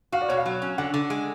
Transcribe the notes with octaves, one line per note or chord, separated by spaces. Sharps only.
F#4 F5
D5
B2 C#5
F5
F#3
C#4
D3 F#5
D3
G#3